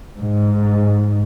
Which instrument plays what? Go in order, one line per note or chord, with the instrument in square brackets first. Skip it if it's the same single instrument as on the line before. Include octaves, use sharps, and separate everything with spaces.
[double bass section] G#2